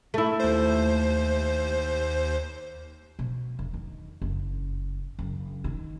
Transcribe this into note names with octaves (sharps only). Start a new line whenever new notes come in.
A3 E4
D#2 C5
B2
E1
D#3
F#1
F#1
D#3